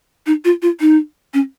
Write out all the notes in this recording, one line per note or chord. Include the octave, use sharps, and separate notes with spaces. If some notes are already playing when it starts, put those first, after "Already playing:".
D#4
F4
F4
D#4
C#4